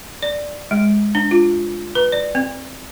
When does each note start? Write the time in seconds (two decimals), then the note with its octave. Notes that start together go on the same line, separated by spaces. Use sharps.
0.22 D5
0.71 G#3
1.15 D4
1.31 F4
1.95 B4
2.12 D5
2.35 C4